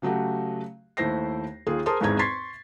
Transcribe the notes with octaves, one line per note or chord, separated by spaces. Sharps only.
C#3 F#3 A3 F#4 G4
D#2 A3 E4 C5 A#6 C7
D#2 F4 G#4
G#4 A#4 C5 A5 C6 D#6
G#1 E2 G#2 G#4 A#5 G#6
C6 C#6 G#6 A6 B6 C7